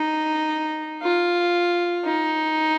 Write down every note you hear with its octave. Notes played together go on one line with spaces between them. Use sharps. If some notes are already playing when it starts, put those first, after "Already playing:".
Already playing: D#4
F4
D#4